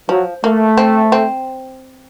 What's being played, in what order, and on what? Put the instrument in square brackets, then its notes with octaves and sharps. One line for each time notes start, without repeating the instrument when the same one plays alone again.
[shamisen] F3 [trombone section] F#3
[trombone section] A3 [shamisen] A#3
[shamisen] C4
C4